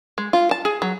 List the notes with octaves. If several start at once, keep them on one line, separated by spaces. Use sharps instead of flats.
G#3
F4
A5
G#4
F#3